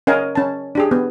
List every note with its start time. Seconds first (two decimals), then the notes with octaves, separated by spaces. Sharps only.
0.07 C#4 A#4 D#5 F5 G#5
0.35 C#4 A5
0.75 D4 G4 G#4
0.91 B3